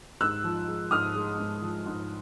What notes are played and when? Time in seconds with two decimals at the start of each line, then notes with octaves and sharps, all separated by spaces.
0.21 G#2 E6 F#6
0.44 F3
0.67 G#3
0.91 G#2 D#6 F6
1.15 G#3
1.38 G#2
1.62 F3
1.86 G#2